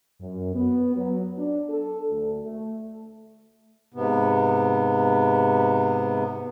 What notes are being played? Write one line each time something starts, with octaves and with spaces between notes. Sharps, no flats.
F#2
B3
F#3
D4
A4
D2
A3
G#2 C3 B3